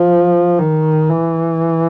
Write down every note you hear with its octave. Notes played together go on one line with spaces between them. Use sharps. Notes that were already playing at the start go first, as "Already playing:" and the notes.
Already playing: F3
D#3
E3